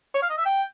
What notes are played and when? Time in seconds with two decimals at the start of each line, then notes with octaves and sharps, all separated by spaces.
0.14 C#5
0.22 F5
0.30 D#5
0.38 E5
0.46 G5